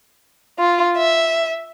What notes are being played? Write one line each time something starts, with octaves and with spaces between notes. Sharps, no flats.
F4
E5